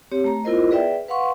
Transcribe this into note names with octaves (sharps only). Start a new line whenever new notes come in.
C4 G4 C#5
A3 A#5
B3 E4 F4 A#4 C5 D#5
G#4 B4 D5 E5 G5
B4 F5 F#5 C6 C#6